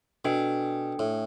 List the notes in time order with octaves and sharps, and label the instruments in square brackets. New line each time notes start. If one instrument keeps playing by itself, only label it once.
[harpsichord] B2 [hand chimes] D4 A4 G5
[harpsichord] A2